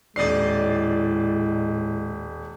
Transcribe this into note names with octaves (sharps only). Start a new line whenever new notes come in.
D#1 A2 G#3 D#4 D5 D#5 C7